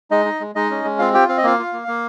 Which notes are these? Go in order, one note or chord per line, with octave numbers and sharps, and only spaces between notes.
G#3 D#4 D#5
D#4
G#3
G#3 D#4 D#5
C#4
G#3
C4 F4 F5
F4 G4 G5
C4 F5
D#5
A#3 F4 F5
F4
A#3
A#3